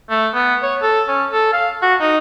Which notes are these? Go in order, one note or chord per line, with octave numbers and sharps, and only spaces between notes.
A3
B3
C#5
A4
C#4
A4
F5
F#4
D#4